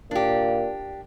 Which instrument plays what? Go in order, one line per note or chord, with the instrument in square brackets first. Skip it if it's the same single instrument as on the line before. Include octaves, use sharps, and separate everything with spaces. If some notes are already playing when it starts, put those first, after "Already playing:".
[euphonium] A#2 [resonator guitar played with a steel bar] D4 G4